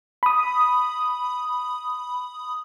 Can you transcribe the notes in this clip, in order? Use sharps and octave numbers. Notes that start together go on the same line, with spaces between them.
B5 D#6